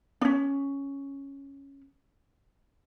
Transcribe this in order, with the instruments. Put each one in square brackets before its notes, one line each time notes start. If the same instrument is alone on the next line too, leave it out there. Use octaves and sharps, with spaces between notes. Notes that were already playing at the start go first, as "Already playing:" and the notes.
[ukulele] C#4 D4